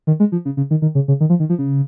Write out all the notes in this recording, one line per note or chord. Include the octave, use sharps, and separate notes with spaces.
D#3
G#3
F3
C#3
C#3
D#3
D#3
C#3
C#3
D#3
F3
D#3
F3
C#3